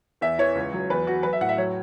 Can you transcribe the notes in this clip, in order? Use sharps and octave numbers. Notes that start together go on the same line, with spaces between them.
E2 E5
E3 C#5
C#2
F#3
E2 B4
F#3 F#4
F#3 B4
E5
A2 F#5
E5
F#3 C#5